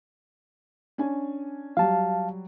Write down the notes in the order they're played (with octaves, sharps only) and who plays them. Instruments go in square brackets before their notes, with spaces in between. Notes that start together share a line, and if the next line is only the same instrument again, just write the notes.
[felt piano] C#4 D4 G#5
[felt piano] F#3 G3 [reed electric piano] F5 A5